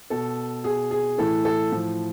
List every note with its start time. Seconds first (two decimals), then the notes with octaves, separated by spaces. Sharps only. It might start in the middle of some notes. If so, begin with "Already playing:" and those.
0.10 B2 A4
0.64 B2 G#4
0.91 G#4
1.18 A2 E3 A4
1.45 A4
1.72 A2 F3